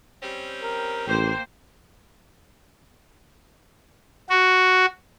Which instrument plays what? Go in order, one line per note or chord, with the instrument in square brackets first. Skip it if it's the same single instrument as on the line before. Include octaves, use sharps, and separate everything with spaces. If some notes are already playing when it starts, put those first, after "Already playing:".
[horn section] G3 C4 C#4
[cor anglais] A#4
[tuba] A1 [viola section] A#3 C5 [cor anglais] G5
[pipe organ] F#4